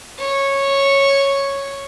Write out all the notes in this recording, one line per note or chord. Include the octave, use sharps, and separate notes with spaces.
C#5